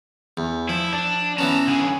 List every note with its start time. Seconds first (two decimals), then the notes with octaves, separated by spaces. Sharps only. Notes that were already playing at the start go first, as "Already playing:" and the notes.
0.37 E2
0.69 F3 E4
0.93 D4
1.38 E3 B3 C#4 A5 A#5
1.68 D3 G#4